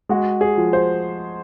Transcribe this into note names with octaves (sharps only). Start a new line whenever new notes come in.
G#3 F#4
G#4
F3
C5